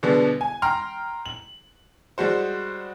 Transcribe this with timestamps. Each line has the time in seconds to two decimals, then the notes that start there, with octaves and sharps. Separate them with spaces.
0.03 B2 D3 G3 G#3 B3
0.41 G#5
0.62 G5 A#5 C6 F6
1.26 F#7
2.18 G3 G#3 F#4 C5